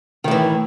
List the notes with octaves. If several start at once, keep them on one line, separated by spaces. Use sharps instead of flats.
A2 D#3 E3